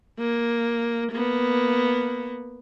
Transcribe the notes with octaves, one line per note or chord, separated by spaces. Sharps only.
A#3
A#3 B3